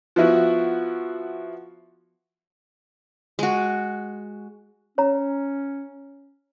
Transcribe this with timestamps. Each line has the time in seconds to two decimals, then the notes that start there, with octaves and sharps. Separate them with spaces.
0.16 F3 B3 E4 F#4
3.39 G#3 F#4
4.98 C#4 C#5 A#5